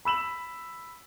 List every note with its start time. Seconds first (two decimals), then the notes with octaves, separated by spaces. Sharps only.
0.05 B5 E6 E7 F#7